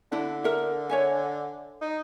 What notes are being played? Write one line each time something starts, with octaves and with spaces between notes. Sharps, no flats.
D3 D4 E4
A#4 E5
C#5 E5 G#5
D#4